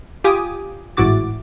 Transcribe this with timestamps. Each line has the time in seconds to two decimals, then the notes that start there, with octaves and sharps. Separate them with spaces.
0.24 F4 G4 G#5 D6 D#6
0.97 A1 G#2 E4 F#4 D6 A6